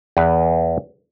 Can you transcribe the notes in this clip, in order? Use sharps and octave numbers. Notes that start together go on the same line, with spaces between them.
E2 B4